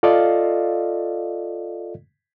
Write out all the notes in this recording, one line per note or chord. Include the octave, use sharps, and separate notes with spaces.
F4 A4 D5 D#5 F5